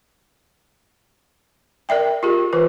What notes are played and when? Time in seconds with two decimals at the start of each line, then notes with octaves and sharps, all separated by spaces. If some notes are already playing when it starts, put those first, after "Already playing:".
1.89 A#4 D5 E5 G5
2.23 F4 G4 G#4 A#4
2.53 E3 F4 B4